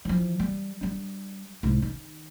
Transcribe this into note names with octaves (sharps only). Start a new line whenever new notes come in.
E3 F3
G3
G3 D4
C2 G#2
D#3